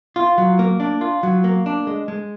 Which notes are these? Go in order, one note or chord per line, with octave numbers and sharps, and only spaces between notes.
F4
F#3
A#3
D4
F4
F#3
A#3
D4
G#3
G#3